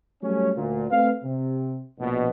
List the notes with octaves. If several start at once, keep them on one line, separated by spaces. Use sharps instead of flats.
F#3 G3 A3 C#4
D2 A#2
A3 C4 B4 F5
C3
A#1 B2